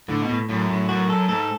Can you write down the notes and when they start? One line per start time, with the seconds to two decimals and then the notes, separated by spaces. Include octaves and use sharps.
0.09 A2 D3
0.22 B2
0.29 A2
0.49 F#2 A2
0.70 A2
0.89 F#2 F#4
1.10 A4
1.29 G#2 A4